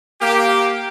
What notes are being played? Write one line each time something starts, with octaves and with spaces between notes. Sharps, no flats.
A#3 G4